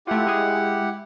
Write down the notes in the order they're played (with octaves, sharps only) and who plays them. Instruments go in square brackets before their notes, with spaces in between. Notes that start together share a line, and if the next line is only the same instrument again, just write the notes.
[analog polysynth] A3 F4 [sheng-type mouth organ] E4 G4 F#5
[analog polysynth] G#3 G#4